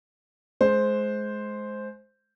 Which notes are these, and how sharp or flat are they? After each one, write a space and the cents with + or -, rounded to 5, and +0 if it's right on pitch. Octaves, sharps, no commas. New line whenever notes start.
G#3 +25 C5 +0